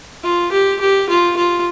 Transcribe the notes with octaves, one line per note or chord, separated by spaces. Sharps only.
F4
G4
G4
F4
F4